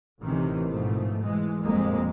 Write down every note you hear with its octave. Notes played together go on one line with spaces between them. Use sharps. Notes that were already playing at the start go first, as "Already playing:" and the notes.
A1 C3 D#3 E3
G#2 B2 F3 A3
E3 G#3
G1 F2 A#2 G#3 A#3